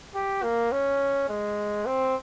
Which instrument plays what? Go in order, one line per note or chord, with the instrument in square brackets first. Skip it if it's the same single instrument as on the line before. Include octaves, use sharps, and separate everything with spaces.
[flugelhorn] G4
A#3
C#4
G#3
C4